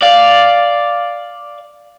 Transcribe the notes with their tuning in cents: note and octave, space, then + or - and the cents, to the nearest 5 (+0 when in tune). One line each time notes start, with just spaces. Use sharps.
D5 +0 F5 +0